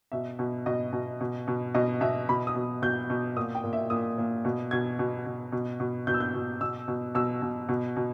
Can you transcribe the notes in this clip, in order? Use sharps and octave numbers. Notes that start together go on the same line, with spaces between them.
B2 E5
B2
B2 D#5
B2
B2
B2
B2 D#5
B2 E5
B2 B5
D#6
B2
B2 G6
B2
A#2 D#6
G5
A#2
E5
A#2 D#6
A#2
B2
B2 G#6
B2
B2
B2
B2
B2 G6
E6
G6
B2
B2 E6
B2
B2 E6
B2
B2
B2